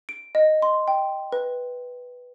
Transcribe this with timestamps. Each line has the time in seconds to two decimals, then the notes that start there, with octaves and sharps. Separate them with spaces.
0.09 D7
0.35 D#5
0.62 C6
0.88 G5
1.32 B4